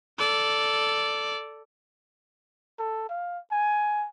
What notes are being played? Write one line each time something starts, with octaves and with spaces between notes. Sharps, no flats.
A4 D5
A4
F5
G#5